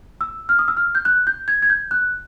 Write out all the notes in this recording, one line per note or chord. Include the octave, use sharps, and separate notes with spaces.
E6
F6
D#6
E6
F6
G6
F#6
G6
G#6
G#6
G6
F#6